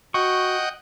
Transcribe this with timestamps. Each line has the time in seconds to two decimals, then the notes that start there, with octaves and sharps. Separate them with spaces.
0.14 F#4 D#5 F#5 G5 C#6